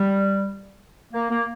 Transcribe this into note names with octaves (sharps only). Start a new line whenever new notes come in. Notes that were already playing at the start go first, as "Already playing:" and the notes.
Already playing: G3
A#3
A#3